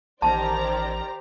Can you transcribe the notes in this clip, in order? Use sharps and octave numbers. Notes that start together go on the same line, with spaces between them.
A1 D#3 G4 C5 D5 A5 A#5